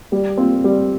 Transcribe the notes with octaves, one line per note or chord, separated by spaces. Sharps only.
G3
C4 F4
G3